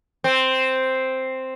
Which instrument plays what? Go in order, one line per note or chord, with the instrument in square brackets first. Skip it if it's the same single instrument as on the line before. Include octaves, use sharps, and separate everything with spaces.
[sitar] C4